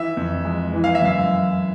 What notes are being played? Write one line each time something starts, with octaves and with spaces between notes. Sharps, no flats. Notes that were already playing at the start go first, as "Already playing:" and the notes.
Already playing: E3 E5
F2
G#3
E3
F5
E5
F#2 F5